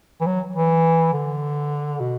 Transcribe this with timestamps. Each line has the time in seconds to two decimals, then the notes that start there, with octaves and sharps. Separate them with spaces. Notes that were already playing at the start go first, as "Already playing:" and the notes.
0.21 E3
0.26 F#3
0.56 E3
1.13 D3
2.00 B2